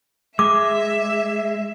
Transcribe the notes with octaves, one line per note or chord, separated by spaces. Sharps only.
G#3 E5 D6